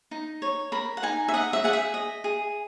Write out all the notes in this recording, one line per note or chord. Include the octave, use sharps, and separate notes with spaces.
D#4
C#5
A#4 B5
F#5
D#4 G#5
E5
D#5 F#5
E5
G#4 F#5
E5
D#5
G#4